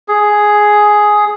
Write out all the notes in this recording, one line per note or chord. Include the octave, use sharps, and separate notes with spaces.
G#4